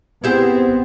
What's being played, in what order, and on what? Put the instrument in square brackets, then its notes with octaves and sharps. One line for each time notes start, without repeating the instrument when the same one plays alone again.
[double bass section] B3 C4 [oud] E4 G4 G#4